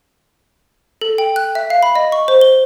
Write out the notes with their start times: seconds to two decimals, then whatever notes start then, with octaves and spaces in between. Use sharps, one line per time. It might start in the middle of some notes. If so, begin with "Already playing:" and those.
1.01 A4
1.18 G5
1.36 F#6
1.55 E5
1.70 F5
1.83 B5
1.95 D#5
2.12 C#6
2.28 C5
2.41 G7